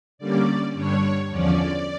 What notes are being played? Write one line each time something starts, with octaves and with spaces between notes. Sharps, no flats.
D3 G3 A#3 C#4 D5
G2 D3 G3 D4 C#5
E2 D3 F3 C#4 D5